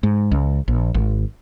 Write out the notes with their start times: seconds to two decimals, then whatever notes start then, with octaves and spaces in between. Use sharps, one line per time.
0.03 G#2
0.32 C#2
0.68 A#1
0.94 G#1